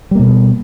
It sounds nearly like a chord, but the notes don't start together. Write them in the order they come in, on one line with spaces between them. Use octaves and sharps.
G3 A#3 B2